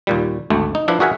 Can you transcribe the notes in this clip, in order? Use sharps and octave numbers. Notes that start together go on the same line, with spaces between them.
D#2 A#2 G3
G#1 D2 A3
D#4
F3 D4 E4 B4
F#4 G#4 A#4 E5 F#5 G#5